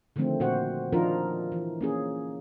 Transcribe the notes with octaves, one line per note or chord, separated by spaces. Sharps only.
D3 D#3 F3 A3 C4
A#2 F#4 C5 F#5
D#3 F3 D4 D#4 F4 A#4
E3
A#3 C#4 G#4